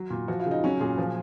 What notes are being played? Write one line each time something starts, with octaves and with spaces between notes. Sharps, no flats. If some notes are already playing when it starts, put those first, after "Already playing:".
Already playing: F#3
A#2
F3 F#4
F4
C#3
D#4
F#3 C#4
A#2 G#4
F3